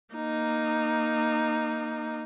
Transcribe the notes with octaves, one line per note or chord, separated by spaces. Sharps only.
A#3 D#4